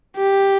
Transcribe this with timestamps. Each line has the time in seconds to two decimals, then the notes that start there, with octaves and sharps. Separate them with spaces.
0.17 G4